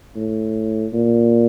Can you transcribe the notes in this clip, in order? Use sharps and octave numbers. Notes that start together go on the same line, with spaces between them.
A2
A#2